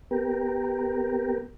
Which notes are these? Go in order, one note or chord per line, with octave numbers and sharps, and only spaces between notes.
B3 G4 A#4